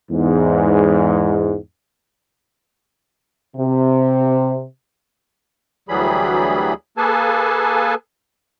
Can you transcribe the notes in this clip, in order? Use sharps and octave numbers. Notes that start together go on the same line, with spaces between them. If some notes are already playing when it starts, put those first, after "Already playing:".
E2 G#2
C3
D2 E3 F#3 G3 G#4 B5
A#3 G#4 A4 B4 G#5 A5